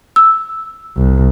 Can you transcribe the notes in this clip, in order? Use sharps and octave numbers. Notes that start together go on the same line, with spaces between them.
E6
C2